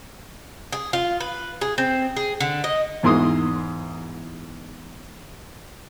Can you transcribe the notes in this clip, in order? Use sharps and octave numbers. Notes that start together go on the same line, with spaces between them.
G#4
F4
B4
G#4
C4
G#4
D3
D#5
E2 G#2 E4 C6 D#6